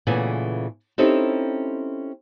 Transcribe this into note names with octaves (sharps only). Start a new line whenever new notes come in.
A#2 C#3 E3 A3 B3 G#5
C4 C#4 D#4 E4 G4 A4